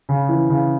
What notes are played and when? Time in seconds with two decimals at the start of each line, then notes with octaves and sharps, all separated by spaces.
0.09 C#3
0.29 E3
0.50 C#3